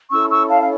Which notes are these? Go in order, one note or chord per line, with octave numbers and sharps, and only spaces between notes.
C#4 E4 A4 C#6 E6
C#6 E6
F5 A5
F5